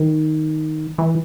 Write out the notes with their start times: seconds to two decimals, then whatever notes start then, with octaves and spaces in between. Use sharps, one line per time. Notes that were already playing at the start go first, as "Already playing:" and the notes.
Already playing: D#3
0.98 E3